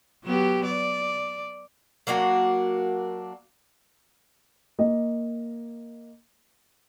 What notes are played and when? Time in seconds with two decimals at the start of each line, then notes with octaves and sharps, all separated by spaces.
0.24 F#3 B3 G4
0.65 D5
2.07 F#3 A#3 D4 F#4
4.79 A#3 D#5